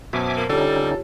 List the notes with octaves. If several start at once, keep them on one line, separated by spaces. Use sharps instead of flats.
F#2 B2 C5 E5 G#5 A5 D6
A#3
D3 G3 C#4 D#4 F4 G4 A4 C#5